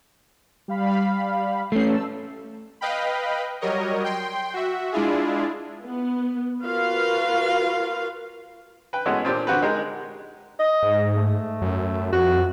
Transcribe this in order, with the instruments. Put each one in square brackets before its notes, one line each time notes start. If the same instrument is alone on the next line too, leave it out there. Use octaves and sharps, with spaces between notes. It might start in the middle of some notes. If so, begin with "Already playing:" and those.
[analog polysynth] G3 F5 B5
[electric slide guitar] A3 C#4 [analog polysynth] G6 C7
[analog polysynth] A5 E6
[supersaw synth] B4 D#5 F5 G5 B5
F#3 G3 A#4 C#5 D#5
G5 C6
F#4 E5
G#3 D4 E4 F4 G#4
[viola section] B3
F4 F#4 A#4 B4 F5
[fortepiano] B4 G5
G#3 A3 B3 C#4 E4 F#4
A#2 C4 D4 G4
D3 C4 F#4 G4 B4
G#3 D#4 G4 G#4 A#4
[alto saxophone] D#5
[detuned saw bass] G#2
[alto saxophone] A3
[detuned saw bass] F#2
[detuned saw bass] F2 [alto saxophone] F#4